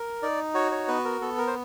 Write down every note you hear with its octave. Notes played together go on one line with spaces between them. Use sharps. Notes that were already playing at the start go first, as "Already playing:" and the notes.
Already playing: A#4
D#4 D5
F#4 C#5
C#5
B3 B4
A#4
B3 A4
A#4
C5